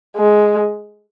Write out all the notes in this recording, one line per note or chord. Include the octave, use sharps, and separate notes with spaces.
G#3